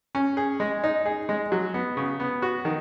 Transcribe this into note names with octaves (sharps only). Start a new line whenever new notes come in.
C#4
G#4
G#3
D#4
G#4
G#3
F#3
B3
C#3
B3
F#4
D#3